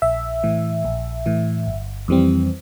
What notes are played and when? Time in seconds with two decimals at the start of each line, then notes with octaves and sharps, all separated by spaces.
0.02 A#1 E5
0.44 A2 E3
0.85 A#1
1.26 A2 E3
1.67 G1
2.08 F2 E3 G3 C4